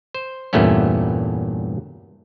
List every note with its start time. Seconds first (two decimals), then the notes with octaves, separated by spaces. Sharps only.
0.15 C5
0.53 E2 G2 A#2 A3 B3 C#4